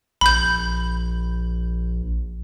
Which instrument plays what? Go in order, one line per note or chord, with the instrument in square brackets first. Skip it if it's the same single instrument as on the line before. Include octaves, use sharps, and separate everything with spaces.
[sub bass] A#1 [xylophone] B5 G6